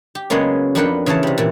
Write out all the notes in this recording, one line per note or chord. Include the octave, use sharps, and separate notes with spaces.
G4
C#3 F#3 G#3 A#3 B3 C#4
F2 D4 A#4 B4 F#5 G5
C#3 E3 C#5 F5 A5
C3 G3
A#2 E3